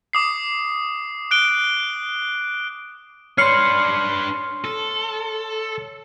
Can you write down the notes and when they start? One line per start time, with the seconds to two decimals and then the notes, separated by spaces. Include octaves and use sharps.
0.13 D6 D#6 C7
1.31 F#6 D7 G7
3.38 D4 B4 C#5 C6 F6 C7 C#7
4.64 A4